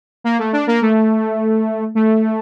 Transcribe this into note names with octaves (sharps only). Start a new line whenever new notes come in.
A#3
A3
D4
A#3
A3
A3